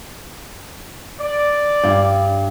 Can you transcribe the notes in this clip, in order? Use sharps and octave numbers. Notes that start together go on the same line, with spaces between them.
D5
G2